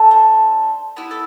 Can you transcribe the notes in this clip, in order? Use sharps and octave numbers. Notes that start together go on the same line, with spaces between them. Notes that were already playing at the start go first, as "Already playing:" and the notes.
Already playing: A3 D4 A4
C5
B3 E4 G4 B4
A4